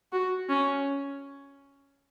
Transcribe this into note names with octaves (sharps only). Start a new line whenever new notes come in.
F#4
C#4